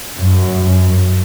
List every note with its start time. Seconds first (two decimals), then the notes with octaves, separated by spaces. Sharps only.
0.19 F#2